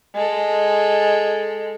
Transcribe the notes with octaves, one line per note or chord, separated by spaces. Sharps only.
G#3 A4